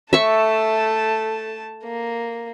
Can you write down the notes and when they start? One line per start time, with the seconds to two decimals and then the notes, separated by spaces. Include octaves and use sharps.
0.13 A3 E5 A5 C#6
1.84 A#3